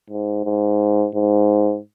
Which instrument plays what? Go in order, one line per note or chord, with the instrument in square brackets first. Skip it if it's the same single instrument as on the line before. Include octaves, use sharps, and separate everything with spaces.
[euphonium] G#2
G#2
G#2